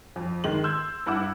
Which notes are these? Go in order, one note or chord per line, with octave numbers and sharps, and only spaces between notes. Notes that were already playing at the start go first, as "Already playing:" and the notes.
F2
D#3 G#3 F#7
C6 E6 G6 G#6
G2 E4 F#5 D6 E6